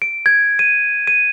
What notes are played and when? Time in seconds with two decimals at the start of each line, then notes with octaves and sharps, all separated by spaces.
0.02 D7
0.26 G#6
0.59 D#7
1.07 D#7